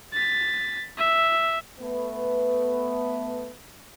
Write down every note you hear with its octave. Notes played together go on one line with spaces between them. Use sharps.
A6 B6
E5
A3 B3 B4